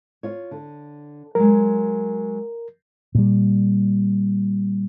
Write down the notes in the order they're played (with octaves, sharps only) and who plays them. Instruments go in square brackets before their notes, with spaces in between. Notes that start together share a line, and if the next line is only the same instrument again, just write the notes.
[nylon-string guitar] F4 C#5
D3
[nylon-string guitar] F#3 G#3 [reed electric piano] A#4
[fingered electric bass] A#2 G3